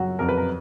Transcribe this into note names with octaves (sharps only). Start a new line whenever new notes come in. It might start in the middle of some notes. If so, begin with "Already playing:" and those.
Already playing: F#2 C#3 F#3 F#4
F2 A#4
B4
A#4